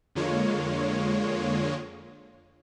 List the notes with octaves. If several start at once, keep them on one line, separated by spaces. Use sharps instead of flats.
F2 D3 G#3 A#3 F4 C#5